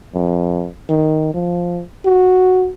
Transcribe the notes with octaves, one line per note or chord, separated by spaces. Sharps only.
F2
D#3
F3
F#4